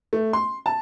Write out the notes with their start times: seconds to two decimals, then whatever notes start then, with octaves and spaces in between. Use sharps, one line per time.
0.13 A3
0.33 C6
0.66 A5